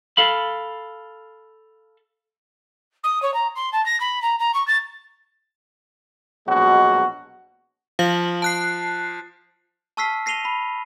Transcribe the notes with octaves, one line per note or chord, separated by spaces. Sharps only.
A4 F5 B5
D#6
C#5
A#5
C6
A5
A#6
B5
A#5
A#5
C#6
A6
A#1 B2 F#3 G#3 F#4
F3 F5 F#7
A5 F#6 C7
A5 C#6 E6 F6 B6 C7
A#6 C7 D#7 F7 G7
B5